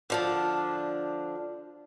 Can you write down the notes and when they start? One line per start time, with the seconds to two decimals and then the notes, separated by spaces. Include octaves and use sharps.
0.10 D3 F3 D4